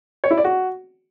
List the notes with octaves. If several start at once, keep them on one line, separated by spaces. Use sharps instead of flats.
C#5
E4
D5
F#4